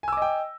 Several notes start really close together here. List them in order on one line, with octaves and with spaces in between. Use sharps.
G#5 E6 D6 D#5 G5